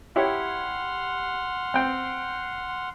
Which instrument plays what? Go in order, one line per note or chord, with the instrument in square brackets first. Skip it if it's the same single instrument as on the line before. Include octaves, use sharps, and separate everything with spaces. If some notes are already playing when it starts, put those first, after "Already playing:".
[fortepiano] E4 G4 C#5 [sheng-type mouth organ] F#5 C6 F6
[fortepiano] C4 G5